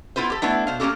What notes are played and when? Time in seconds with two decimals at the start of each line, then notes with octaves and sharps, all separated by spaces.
0.16 B3 E4 F4 B4 C5
0.30 G4 A4
0.42 A3 B3 D4 E4
0.67 B2 C5 F5
0.80 A#3 C#4 E4 G4 A4